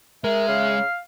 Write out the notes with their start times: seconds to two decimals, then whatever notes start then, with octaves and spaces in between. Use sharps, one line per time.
0.24 G#3 A#4 E5
0.48 C#3 F5